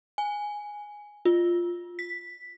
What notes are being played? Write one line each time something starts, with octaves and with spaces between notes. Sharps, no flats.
G#5
F4
B6